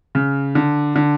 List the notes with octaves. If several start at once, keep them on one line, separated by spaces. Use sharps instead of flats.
C#3
D3
D3